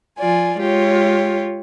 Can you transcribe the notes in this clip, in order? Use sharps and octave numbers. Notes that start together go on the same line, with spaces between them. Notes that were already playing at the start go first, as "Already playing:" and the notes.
F3 F4 D5 G#5
G#3 F4 G4 C#5